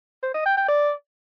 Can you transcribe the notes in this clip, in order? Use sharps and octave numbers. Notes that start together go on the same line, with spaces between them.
C5
D#5
G5
G5
D5